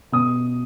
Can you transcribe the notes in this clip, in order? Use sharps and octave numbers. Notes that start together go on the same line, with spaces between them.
B2 D#6